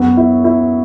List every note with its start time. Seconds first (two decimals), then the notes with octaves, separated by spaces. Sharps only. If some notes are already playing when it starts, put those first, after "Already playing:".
Already playing: F#2 B3
0.17 E4
0.44 E4